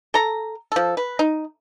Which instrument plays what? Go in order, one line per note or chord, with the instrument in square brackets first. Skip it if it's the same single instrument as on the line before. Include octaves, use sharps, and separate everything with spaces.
[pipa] A4 A#5
F3 A4
B4
D#4